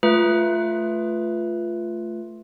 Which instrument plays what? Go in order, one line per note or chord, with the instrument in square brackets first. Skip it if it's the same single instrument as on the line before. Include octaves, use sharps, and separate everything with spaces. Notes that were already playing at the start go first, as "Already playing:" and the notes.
[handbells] A3 F4 B4